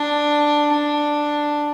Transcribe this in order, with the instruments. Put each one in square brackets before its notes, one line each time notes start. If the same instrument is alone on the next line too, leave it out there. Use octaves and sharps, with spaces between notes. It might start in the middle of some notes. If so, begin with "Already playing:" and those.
Already playing: [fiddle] D4
D4